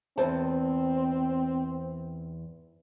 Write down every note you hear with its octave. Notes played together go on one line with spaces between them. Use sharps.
E2 C4 C5 A5